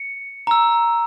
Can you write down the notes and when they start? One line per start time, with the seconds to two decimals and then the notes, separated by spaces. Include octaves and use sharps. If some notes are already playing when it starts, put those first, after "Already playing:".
Already playing: C#7
0.47 A#5 E6